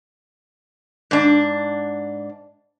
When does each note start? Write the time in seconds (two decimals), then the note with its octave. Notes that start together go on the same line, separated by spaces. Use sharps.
1.11 G#2 D4